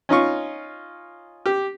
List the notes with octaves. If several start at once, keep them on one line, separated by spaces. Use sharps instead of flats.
C#4 D#4 F4 C#6
G4